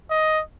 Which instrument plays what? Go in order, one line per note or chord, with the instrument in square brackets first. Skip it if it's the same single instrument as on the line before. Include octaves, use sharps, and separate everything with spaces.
[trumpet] D#5